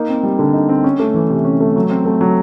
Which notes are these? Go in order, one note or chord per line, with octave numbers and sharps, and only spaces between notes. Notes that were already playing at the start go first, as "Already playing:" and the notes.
Already playing: A#3 D#4
C4
G3
D3
D#4
C4
C#4
A3
E3
C3
C#4
A3
F#3
C4
A3
F#3